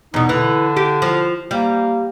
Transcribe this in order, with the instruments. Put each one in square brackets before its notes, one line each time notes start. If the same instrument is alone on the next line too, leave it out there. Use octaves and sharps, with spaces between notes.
[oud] E2 B2 [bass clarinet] D#4
[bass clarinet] D3 [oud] E3
[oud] G4
F3
[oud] G3 [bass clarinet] A#3